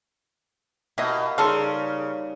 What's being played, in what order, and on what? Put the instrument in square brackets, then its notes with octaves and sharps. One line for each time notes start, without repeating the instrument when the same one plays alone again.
[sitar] B2 [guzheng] A#3 G4 [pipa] E4 D#5
[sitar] C#3 [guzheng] G3 A#3 D#4 [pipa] F4 A4 F5